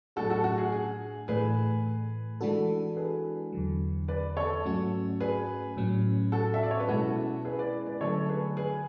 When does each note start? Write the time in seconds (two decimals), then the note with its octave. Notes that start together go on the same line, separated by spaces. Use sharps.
0.16 A2 F#3 A3 D4 F#4 G#4 A4
0.30 F#4 A4
0.44 F#4
0.58 G#4
0.72 G#4
1.28 A2 E3 A3 G#4 B4
2.41 E3 G#3 D4 F#4 A4
2.97 G#4 B4
3.53 E2 D3 F#3
4.08 B4 D5
4.37 A4 C#5
4.65 G#2 F#3 A3 C#4 F#4
5.20 G#4 B4
5.77 A2 F#3 C#4
6.32 F#4 A4
6.54 E5
6.63 D5
6.71 C#5
6.80 B4
6.88 B2 G#3 C#4 E4 F#4 A4
7.45 G#4 B4
7.59 B4 D5
7.87 B4 D5
8.01 D3 F#3 A3 A4 C#5
8.29 G#4 B4
8.57 G#4 B4